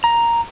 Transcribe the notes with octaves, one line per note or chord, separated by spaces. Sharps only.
A#5